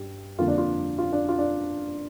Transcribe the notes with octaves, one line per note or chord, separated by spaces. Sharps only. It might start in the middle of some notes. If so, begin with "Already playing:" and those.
Already playing: G2 G4
F2 D3 A#3 F4
D4
F4
F4
D4
F4
D4